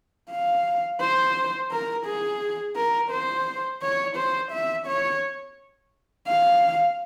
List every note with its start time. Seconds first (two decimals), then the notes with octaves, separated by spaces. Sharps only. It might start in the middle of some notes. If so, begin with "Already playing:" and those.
0.31 F5
1.00 C5
1.72 A#4
2.06 G#4
2.76 A#4
3.11 C5
3.82 C#5
4.16 C5
4.52 E5
4.87 C#5
6.27 F5